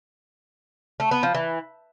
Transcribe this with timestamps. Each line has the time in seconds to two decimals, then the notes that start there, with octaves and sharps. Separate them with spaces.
1.00 A3
1.11 B3
1.23 F3
1.34 E3